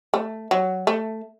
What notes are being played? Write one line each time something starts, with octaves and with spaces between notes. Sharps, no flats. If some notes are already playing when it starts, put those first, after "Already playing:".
A3
F#3
A3